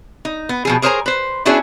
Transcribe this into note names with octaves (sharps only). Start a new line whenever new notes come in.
D#4
B3
B2 F3 G#4
G#4 A#4 C5 C#5 G#5 A#5
B4 C5
B3 C#4 D4 E4 F#4 G#4